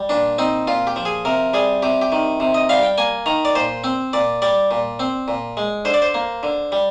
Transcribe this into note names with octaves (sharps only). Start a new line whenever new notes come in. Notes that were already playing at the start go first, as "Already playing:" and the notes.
Already playing: G3
A#2 D4
C4 D#4
A#2 F4
G4
F3
G#4
C3 A#4
G3 G#4
C3 G4
G4
D#3
C3
D#5
G3 F5
G5
A#3 G#5
D#3 A#5
D5
A#2 C5
C4
A#2 D5
G3 D5
A#2
C4
A#2
G#3
D3 C5
D5
C5
A#3
D3
G3